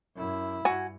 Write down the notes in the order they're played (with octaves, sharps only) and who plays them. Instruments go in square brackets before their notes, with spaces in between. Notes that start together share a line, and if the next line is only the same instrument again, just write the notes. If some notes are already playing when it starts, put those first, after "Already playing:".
[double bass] F#2 E4
[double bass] G2 [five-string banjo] F#4 G#5